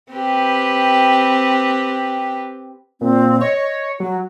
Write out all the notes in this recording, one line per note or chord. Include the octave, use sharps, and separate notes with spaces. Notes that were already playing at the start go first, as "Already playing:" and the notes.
C4 G4 B4
A#2 C4
C#5 D#5
D#5
F#3 F#4